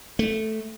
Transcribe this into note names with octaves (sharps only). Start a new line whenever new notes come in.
A3